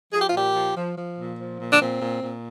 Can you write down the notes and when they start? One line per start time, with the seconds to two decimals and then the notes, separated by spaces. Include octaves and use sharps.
0.12 F3 G#4
0.21 G4
0.28 F4
0.33 A#2 G4
0.55 F3
0.76 F3
0.96 F3
1.18 A#2
1.38 F3
1.59 A#2
1.71 D4
1.81 A#2 C4
2.02 A#2
2.23 A#2